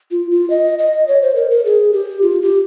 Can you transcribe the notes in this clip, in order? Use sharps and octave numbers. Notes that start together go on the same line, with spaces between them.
F4
F4
D#5
D#5
C#5
C5
A#4
A#4
G#4
G4
F4
G4